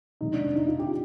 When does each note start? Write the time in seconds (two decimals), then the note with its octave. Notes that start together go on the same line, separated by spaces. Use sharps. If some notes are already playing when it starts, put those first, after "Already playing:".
0.21 C3 D#3 G#3 D#4
0.33 D4
0.44 D4
0.56 D#4
0.68 F4
0.79 G4